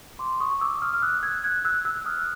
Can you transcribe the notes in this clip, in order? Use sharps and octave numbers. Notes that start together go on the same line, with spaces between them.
C6 D6
C#6 D#6
D6 E6
D#6 F6
F6
E6 F#6
F#6 G#6
F#6 G#6
E6 F#6
E6 F#6
D#6 F6